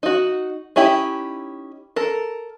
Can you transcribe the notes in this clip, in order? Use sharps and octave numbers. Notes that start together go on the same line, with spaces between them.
D#4 F#4
C#4 D#4 E4 G4
A4 A#4